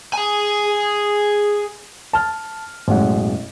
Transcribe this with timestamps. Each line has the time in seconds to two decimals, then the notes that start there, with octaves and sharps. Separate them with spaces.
0.14 G#4 G#5
2.13 A5 F6
2.88 A1 F#2 B2 G#3 F#5